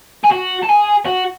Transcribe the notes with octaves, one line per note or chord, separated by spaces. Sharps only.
G#4
F#4
A4
G#4
F#4